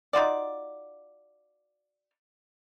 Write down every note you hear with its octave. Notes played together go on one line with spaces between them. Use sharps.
D#4 F4 F#4 D5